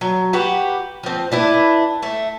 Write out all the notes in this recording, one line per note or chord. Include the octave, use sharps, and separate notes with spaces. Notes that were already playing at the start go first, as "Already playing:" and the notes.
F#3
F#4 G4 B4
F3 C4
D4 E4 B4
A3 E5